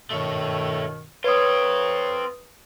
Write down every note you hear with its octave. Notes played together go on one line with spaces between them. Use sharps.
G2 B2 D#3 A3 C#5
C4 F4 B4 C#5 D#6